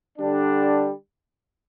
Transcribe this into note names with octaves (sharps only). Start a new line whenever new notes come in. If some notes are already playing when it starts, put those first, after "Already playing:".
D3 G3 D4